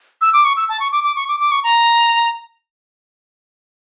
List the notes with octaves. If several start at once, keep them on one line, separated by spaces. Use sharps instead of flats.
E6
D6
C#6
E6
A5
C#6
D6
D6
C#6
D6
D6
C#6
A#5